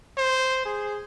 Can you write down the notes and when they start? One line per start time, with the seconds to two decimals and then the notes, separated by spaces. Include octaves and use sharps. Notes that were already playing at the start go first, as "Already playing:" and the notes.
0.18 C5
0.65 G#4